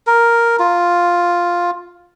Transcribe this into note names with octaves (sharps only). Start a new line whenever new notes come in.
A#4
F4